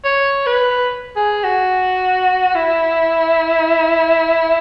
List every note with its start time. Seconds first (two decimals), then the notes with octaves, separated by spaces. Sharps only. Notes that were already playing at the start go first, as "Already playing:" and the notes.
0.05 C#5
0.47 B4
1.16 G#4
1.44 F#4
2.55 E4